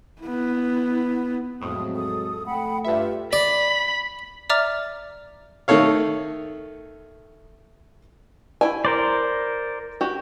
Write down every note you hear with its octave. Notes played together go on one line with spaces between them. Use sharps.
B3 E4
F2 A2 F#3 G#3 C4 D#6
A4 D#6
A3 F#5 G5 B5
G2 F4 G4 B4 E5
D5 B5
D5 E5 A#5 D6 F6 A6
D#3 A3 A4 C#5 F5
E4 G5 G#5
A#4 C5 D5
F#4 G4